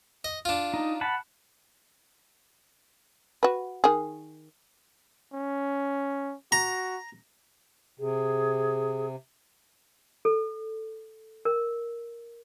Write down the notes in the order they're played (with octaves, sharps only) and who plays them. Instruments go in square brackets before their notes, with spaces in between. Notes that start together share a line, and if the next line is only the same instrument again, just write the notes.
[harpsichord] D#5
D4 F4
[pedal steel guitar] D#4
F#5 A5 B5
[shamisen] F#4 B4
D#3 G#4
[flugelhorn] C#4
[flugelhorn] F#4 [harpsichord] A#5
[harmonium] C3 [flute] G#4
[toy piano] A4
A#4